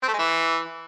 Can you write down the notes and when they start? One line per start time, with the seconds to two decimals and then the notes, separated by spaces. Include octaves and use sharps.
0.03 C4
0.08 A3
0.13 G#3
0.18 E3